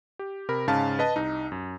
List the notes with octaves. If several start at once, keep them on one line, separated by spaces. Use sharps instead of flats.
G4
C3 A#4 B5
G#2 C#3 C#4 F5 A5
B4 D#5 A5
C2 D#4
F#2